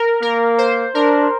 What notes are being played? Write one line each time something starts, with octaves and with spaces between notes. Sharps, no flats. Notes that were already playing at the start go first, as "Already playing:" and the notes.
Already playing: A#4
A#3 A#4
C5
D4 A#4